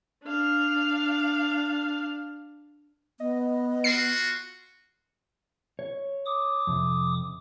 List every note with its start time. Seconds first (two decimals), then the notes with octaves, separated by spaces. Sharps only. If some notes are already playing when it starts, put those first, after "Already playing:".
0.25 D4 F5
3.20 B3 D#5
3.84 F4 F#4 C7
5.79 C#5
6.26 D6 D#6
6.67 F2 C3